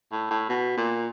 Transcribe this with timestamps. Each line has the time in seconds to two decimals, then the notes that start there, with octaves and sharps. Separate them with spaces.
0.12 A2
0.30 A2
0.49 B2
0.77 A#2